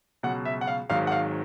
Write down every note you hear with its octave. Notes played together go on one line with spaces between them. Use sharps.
C#2 B2 F#3 F#5
E5
F#5
F5
G#1 G#2 D#3 F#3 F5
F#5
F5